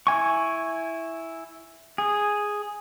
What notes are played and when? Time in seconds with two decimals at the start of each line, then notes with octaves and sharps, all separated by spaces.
0.07 E4 G#5 C#6
1.98 G#4